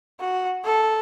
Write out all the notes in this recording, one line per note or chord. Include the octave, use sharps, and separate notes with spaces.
F#4
A4